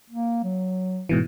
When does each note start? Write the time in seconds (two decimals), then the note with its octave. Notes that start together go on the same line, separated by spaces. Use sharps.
0.10 A#3
0.44 F#3
1.09 G#2 B2 E3